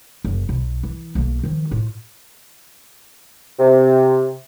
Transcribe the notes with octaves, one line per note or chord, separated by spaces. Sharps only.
F#1 D2
B1
E3
B1 A#3
D#3 F3
A2 F4
C3